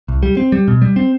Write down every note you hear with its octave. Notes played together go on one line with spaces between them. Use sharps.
C2
G3
C4
G3
B2
G3
C4